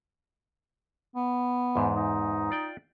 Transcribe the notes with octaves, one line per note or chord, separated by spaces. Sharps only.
B3
E2 G#2
D#4
F4 D5 G5